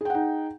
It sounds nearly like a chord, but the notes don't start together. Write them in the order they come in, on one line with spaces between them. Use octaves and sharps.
G#4 G5 F#5 D#4